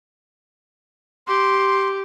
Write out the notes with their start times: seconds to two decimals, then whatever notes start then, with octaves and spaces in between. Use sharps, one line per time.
1.27 G4 C6